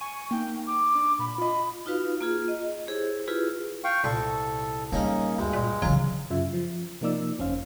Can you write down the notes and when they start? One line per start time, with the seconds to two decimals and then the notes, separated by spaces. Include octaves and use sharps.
0.01 G#5 C#6 D#7
0.31 A#3 D#4 G5
0.67 D6
0.95 D4
1.19 A#2 B5
1.38 F4 D#5 B5
1.86 D#4 F4 F#4 B4 F5
2.21 A#3 F4 G#4
2.48 D#5
2.87 E4 G4 G#4 C5 C#5
3.28 E4 F4 G4 G#4 B4
3.84 F5 G5 C#6
4.04 C2 A#2 A4 C#6
4.92 C#3 G3 A#3 C#4 D#4
5.39 D2 G2 G#3
5.53 A#2
5.82 C#3 E3 F#3 F4
6.30 F#2 C#3 F4 E5
6.53 F3
7.01 C3 F3 A#3 D#4 D5 E6
7.39 G1 F2 C#4 C5 F5